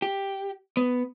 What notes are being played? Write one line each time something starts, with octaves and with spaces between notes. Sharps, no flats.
G4
B3